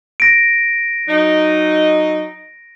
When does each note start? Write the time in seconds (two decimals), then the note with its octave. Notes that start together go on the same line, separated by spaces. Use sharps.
0.20 A#6 D7
1.09 F#3 D#4